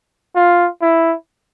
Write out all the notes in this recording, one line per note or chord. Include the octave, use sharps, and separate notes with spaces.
F4
E4